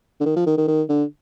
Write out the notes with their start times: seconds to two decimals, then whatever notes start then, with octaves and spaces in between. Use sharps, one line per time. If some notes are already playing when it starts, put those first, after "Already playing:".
0.21 D3
0.26 D#3
0.36 F3
0.47 D#3
0.58 D#3
0.68 D#3
0.89 D3